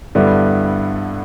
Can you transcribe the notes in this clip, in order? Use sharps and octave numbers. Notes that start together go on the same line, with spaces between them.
G2 D3 G3 B3 E4